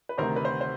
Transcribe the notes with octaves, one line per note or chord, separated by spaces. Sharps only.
B4
D2 C3 D#3 A#4 C5
B4
A#4 C5
C5